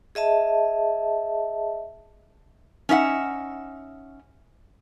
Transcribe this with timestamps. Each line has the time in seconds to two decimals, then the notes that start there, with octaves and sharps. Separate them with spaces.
0.15 G#4 D#5 E5 A5
2.89 C#4 D#4 E5 F#5